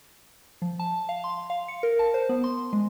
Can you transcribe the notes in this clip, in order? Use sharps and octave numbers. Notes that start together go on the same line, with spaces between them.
F3
A5
F5
C6
F5
C#7
A#4
A5
C5
B3
C6
G#3